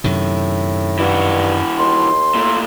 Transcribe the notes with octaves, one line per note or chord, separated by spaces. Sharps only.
F#2 A2 C3 D#3
G2 E3 F#4
D#2 C6
A#2 A3